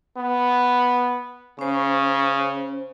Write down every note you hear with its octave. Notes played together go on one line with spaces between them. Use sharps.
B3
C#3 C#4 C5